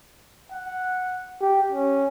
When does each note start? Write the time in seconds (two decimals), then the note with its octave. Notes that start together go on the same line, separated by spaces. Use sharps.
0.52 F#5
1.41 G4
1.72 C#4